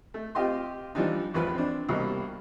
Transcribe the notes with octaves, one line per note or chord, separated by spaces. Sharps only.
A3
C4 F4 G4 D#5 C6
E3 F3 G3 D4 D#4
A1 E2 F3 B4
C4 D4
C2 B2 G3 A#3